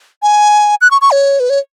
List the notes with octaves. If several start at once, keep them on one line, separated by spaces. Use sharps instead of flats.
G#5
F#6
C#6
C#6
C#5
B4
C#5